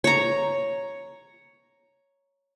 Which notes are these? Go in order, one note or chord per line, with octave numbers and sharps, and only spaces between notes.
C#5 A#5